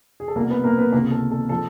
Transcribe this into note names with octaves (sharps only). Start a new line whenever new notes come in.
G#4
A4
C2 B2 A#3 A#4
B3 B4
A#3 A#4
B3 B4
C#2 C3 D#3 A#3 A#4
A4
A4
F3 A4